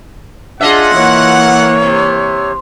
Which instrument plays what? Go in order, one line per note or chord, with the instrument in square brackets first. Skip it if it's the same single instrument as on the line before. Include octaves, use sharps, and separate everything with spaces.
[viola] D4 G#4 [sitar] F4 D#5 E5 [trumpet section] F#5
[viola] E3 A#3 [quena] C#5
[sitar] C3